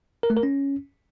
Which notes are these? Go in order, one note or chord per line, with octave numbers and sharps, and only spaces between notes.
A#4
A3
A#4
C#4